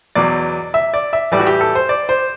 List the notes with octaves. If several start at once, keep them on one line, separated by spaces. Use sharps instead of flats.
E2 B2 F#3 D5
E5
D5
E5
A2 E3 G3 D5
F#4
G4
A4
C5
D5
C5